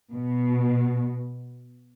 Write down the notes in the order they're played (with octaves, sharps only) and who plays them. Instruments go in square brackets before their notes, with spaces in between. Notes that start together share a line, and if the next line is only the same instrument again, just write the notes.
[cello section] B2